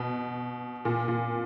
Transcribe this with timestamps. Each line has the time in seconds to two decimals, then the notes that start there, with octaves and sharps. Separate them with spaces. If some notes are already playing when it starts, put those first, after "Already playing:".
Already playing: B2
0.85 A#2
1.08 A#2